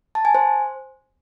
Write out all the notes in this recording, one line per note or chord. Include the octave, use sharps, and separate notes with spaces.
A5
G#5
C5